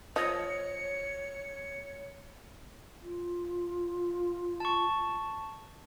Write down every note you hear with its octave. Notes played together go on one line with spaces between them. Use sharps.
F3 C#5 D#5 C#7
F4
A5 C#6